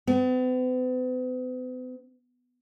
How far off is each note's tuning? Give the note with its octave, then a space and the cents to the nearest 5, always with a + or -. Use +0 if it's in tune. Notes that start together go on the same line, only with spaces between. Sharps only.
B3 +45